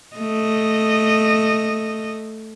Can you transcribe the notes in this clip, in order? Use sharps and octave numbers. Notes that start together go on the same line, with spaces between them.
A3 D#5